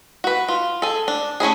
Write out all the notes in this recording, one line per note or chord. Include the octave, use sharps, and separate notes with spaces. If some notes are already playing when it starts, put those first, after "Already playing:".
F#4 B4
F4
G#4 A4
D4
A3 C#4 E4 G#4